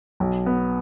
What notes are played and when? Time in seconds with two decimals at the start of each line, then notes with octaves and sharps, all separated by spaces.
0.20 B1
0.46 B3